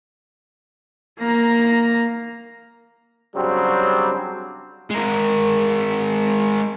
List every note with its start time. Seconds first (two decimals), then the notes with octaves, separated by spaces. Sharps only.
1.19 A#3 A#5
3.35 C#3 F#3 G3 C4 D4
4.90 G#3 A#4